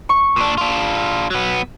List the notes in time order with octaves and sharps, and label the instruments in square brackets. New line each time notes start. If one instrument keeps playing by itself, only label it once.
[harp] C#6
[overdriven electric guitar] A#2 D4
D4 F4
F#3 B3